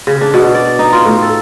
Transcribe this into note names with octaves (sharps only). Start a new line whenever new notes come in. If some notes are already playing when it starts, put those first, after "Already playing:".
C#3
D4
B2
D5
D#4
F4
A2
A4